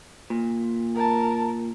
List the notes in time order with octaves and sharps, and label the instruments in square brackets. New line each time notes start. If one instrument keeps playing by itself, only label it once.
[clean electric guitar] A#2
[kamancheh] A#4 A5